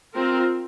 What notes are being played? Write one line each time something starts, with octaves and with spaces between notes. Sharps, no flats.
C4 F4 A#4